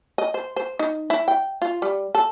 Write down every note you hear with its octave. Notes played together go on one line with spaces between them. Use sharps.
D#5
C5
C5
D#4
E4
G5
F4
G3
A4